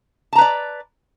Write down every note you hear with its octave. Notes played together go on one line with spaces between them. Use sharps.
B4 D5 A5 A#5